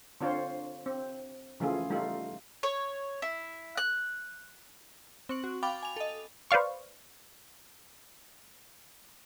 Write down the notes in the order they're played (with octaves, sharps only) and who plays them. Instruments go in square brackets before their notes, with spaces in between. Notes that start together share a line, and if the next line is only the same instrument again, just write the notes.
[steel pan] D3 C4 D4 F4 C5 C#5
C4
C#3 E3 F3 A3 F4 G#4
G3 A3 D#4 F4
[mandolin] C#5
E4
F#6
[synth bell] C4 C#6 F#7
F#4
F5 G5 B5 D6 A6
G#5 F7
A4 D#5
[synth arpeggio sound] B4 C5 D5 F5 C#6